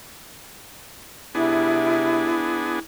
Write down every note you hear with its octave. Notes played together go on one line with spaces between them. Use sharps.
C3 B3 D4 E4 G#4